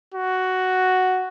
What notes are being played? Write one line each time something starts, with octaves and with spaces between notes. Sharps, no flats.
F#4